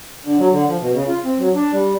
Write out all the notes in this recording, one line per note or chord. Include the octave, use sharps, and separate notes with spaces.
D3
F#3
D3
F3
B2
C#3
F4
C4
F#3
D4
G3